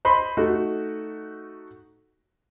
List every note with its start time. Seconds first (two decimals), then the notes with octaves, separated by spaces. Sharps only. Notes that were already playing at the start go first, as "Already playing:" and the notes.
0.05 C5 D#5 B5 C6
0.37 A3 D#4 F#4